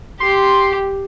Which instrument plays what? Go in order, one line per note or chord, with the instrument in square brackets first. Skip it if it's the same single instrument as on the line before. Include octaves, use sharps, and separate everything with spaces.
[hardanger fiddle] G4 [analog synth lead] C6